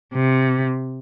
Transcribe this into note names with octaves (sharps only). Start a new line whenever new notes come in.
C3